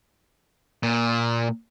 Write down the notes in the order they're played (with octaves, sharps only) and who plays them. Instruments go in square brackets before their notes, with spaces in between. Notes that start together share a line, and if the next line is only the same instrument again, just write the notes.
[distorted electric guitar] A#2